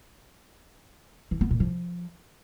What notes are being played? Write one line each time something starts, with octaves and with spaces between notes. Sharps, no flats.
E3
B3
A#2
F3